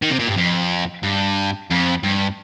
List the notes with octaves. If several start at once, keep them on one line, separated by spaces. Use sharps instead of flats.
D#3
C3
A#2
G2
F2
G2
F2
G2